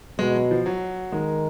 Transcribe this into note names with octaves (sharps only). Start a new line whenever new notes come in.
B2 G#3
F#3
F3
F#3
D#3 G#3